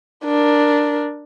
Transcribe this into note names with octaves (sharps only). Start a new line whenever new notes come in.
D4 A#4